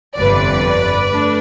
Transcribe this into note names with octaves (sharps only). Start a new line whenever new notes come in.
G1 F2 C3 B4 D5
A3 D4